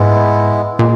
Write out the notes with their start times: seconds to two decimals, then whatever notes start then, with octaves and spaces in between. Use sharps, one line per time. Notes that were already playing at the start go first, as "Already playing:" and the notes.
Already playing: G#2 G#3 B3 E4
0.79 A#2 G#3